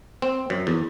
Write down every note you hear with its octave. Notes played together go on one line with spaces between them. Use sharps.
C4
F#2
E2